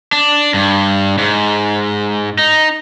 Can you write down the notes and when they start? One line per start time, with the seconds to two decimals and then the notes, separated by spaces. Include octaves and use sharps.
0.12 D4
0.54 G2
1.18 G#2
2.38 D#4